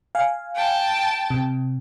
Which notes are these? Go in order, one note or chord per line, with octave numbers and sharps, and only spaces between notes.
F5 G#5
G5 A5
C3